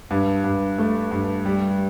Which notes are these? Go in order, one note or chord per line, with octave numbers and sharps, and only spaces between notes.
G2
G2
A3
G2
G3